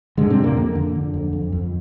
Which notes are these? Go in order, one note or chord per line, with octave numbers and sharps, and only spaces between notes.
G#2 D3 G#3
C3 C4
F2
A#2 A#3
F2
D3
D3
F2
F2
F2